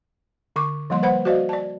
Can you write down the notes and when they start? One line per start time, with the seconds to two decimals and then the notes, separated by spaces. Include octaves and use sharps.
0.56 D3 C#6 D6
0.90 F3 G3 A#3 C6
1.03 B4 C5 F#5 B5
1.25 F#4 C5 D5 D#5 F5
1.49 D5 A5